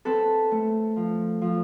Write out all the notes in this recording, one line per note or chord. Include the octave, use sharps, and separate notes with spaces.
C4 A4 B4
A3
F3
F3